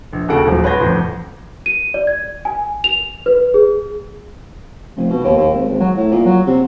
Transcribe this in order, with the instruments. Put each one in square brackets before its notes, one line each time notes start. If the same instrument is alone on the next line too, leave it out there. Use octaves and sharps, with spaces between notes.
[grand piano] A#1
D#2 C#3 F#4 A4 F#5 D7
D#1 F3 F#3
B4 C#5 F#5 C6 G6 A#6
A1 F2
[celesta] D#7
D5
G#6
G#5
F7
B4
G#4
[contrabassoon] F1
B2
D#2
D#2
G#1
G#1
F#3
A2
A#2
F#3
C3